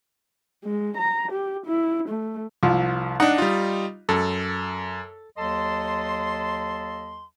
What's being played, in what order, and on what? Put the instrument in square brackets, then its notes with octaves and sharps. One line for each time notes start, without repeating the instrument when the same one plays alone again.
[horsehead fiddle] G#3
A#5
G4
E4
A3
[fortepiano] C2 F3
[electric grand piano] D4 F#5 [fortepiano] D#4
[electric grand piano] G3 F4
[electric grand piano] F#2 [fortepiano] A4
[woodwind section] D#2 F#3 A4 D#5 A5 C6